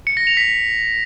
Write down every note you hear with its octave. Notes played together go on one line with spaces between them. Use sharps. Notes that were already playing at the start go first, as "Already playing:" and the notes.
C#7
A#6
F7
B6